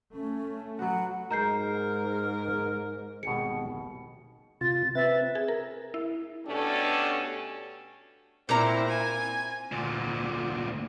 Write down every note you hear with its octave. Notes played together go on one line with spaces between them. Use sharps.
A3 C#4
F#3 B3 F#4 F#5
G#2 G#4 A#4 D#5 A#5 G6 C7
G#1 B2 G4 G#4 C#7
C3 F4 A6
C4 B4 E5 A6
G#4
A#4
E4
B2 A3 C#4 D4 G4 A4
A#2 C4 E4 A#4 A#5
G#5
D2 A#2